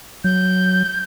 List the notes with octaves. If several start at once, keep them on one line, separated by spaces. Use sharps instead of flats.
F#3 G6